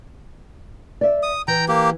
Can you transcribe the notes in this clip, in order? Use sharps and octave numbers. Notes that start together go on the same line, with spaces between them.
D5 E5
D#6
E3 G5 A#5
A#3 G4